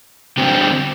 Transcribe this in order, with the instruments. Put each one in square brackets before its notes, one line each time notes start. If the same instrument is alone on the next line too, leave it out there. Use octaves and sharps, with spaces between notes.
[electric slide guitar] D3 G3 C4 G4